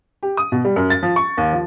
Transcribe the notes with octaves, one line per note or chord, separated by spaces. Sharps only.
G4
D#6
B2
G3
F#2
A6
F3
C#6
D#2
F3